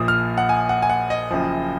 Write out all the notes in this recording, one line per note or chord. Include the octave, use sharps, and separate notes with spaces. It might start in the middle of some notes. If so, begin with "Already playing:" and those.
Already playing: A#1 A#2 F3 D#6
F6
F#5
G#5
F#5
G#5
F#5
D#5
F#1 F#2 F3